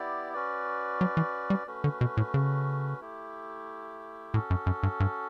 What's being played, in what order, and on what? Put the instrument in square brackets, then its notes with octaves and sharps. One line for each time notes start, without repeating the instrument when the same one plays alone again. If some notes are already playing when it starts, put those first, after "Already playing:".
Already playing: [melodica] B3 E4 G4 D5
C#4 F#4 B4 D5
[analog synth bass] F#3
E3
G3
[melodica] A3 C#4 F#4 B4
[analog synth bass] D3
B2
A2
C#3
[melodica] A3 E4 G4
[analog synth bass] A2 [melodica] C#4 F#4 A4
[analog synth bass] F#2
F#2
G2
G2